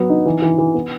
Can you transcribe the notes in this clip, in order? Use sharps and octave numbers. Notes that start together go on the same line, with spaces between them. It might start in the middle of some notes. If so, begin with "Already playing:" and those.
Already playing: F#3 B3
D#4
E3
E3
E3
B3